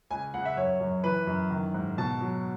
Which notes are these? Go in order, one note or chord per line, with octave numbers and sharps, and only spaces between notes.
C#2 G#5
C#2 F#5
E5
F#2 C#5
F#2
E3 B4
F#2
D#3
G#2
B2 A5
F#3